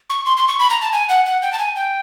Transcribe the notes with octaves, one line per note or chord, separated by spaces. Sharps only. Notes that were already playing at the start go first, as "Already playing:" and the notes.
C#6
C6
C6
C#6
B5
A#5
A5
G#5
F#5
F#5
G5
A5
G#5
G5